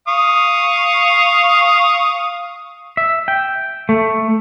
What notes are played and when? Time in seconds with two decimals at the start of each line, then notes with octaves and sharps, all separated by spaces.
0.08 F5 C#6 D#6
2.97 E5
3.28 G5
3.89 A3